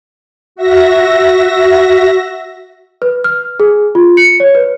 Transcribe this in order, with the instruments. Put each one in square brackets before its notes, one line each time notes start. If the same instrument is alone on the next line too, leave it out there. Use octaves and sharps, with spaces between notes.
[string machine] F#4 E5 A#6
[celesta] B4
F6
G#4
F4
C#7
C#5
B4